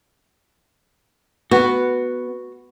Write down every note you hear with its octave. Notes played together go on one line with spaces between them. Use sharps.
B3 F#4